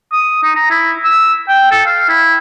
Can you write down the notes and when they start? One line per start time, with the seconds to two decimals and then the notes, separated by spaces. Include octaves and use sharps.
0.12 D#6
0.43 D#4
0.55 A#5
0.70 E4
1.04 E6
1.48 G5
1.71 A4
1.86 F5
2.09 E4